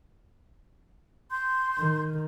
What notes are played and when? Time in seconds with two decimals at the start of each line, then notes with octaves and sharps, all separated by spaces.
1.31 C6 G6
1.79 D#3